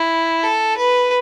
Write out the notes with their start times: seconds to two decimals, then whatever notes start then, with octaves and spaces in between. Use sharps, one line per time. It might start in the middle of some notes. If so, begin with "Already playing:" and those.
Already playing: E4
0.43 A4
0.77 B4